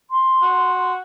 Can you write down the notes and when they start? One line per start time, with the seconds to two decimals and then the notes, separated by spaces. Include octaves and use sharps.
0.10 C6
0.42 F#4